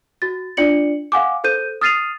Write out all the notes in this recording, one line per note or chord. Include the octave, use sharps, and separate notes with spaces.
F#4 A6
D4 F4 D5 C#7 F#7
F5 F#5 G#5 D6
A4 C5 G6 D#7
D#6 F6 A6 C7 D#7 F7